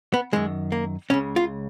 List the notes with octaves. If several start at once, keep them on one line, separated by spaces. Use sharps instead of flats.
B3
F#2 D#3 G#3
A#3
C#2 C#3 C#4
F4